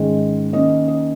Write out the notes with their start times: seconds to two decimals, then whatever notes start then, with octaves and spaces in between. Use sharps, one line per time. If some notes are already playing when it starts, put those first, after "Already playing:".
Already playing: G#2 D#3 G#3 C#4
0.53 D#3 A#3 C#4 D#5
0.88 D#5